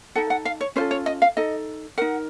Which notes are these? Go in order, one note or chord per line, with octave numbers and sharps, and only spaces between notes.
D#4 A4 F#5
F#5
F5
C#5
C#4 F4 A4 C5
C#5
D#5
F5
D#4 A4 D#5
D#4 A#4 F#5